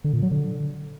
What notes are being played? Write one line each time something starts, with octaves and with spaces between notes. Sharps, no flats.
D3
A#2
F#3
D3